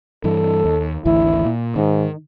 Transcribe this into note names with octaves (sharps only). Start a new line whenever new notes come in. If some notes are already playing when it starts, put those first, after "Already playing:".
G2 E3 A4
D#2
G#1 D2 E3 E4
A#2
G#2 D#3